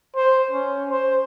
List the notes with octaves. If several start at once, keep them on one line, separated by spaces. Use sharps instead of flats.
C5
C#4
C5